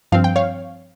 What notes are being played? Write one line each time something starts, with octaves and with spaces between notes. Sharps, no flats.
G2 F3 C4 F5
G5
C#5 F5